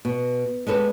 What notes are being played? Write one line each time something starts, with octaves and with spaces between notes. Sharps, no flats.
B2
G#3 C#4 A4 B4